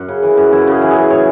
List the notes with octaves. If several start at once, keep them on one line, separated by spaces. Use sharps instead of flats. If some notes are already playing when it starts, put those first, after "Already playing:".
Already playing: F#2 F#4
C#3
E3
F#2
F#2 E4
C#3 G#4
E3
G#4
F#2
A2 C#5